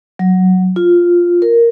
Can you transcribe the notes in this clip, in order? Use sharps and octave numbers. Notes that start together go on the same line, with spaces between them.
F#3
F4
A#4